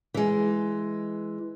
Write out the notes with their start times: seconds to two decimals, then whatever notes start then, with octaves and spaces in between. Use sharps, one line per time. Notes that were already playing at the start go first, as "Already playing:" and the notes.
0.14 E3 G#3